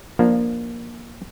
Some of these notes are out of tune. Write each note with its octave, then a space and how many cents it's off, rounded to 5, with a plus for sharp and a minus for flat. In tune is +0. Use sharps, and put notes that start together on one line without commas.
F3 +0 A#3 +10 D4 +0